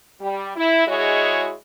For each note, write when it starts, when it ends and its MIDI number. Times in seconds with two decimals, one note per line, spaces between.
0.21 0.49 55
0.56 0.85 64
0.87 1.53 56
0.87 1.53 64
0.87 1.53 66
0.87 1.53 68
0.87 1.53 73
0.87 1.53 75